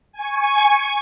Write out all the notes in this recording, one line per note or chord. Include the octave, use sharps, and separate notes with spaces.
G#5 C#6